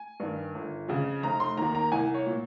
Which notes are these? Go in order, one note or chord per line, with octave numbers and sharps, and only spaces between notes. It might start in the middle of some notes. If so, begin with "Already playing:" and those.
Already playing: G#5
G2 D#3
G1
F2 C#3
F1 A#5
C6
D#2 D#3 A#5
A#5
C2 G#5
C#5
A#2